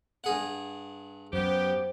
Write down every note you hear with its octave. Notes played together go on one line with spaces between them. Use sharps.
G2 G#4 F#5
F#2 B3 G4 C5